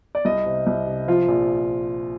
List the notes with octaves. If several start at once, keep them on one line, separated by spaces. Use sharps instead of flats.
D5
C2 D#5
C3
C2
C3
F3 F4
A#1